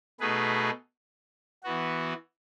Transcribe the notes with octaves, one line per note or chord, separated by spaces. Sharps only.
B2 A3 D#4 G#4 B4
E3 B3 F#4